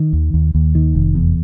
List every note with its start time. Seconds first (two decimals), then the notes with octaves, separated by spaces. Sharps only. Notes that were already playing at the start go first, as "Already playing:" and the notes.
Already playing: D#3
0.13 D#2
0.34 D#2
0.55 D#2
0.75 D#3
0.95 F1
1.15 E2